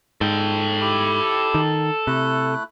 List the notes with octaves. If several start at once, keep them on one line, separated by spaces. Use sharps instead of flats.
G#2 A4 G5
E4 G4
D#3
C3 A3 E4 F#6